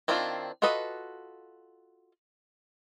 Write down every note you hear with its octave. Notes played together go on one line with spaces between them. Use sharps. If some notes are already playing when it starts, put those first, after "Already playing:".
D#3 C4 D4 E4 F4
F4 F#4 A4 B4 D#5